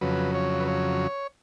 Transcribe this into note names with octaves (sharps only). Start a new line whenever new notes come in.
F2 C#3 F#3 B4
C#5
B4
C#5